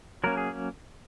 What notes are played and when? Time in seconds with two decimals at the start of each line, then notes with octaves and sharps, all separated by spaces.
0.24 F#3 A#3 C#4 A#4
0.37 G#4